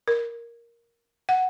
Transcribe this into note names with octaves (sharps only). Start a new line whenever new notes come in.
A#4
F#5